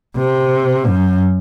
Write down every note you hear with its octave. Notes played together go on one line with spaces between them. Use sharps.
C3
F#2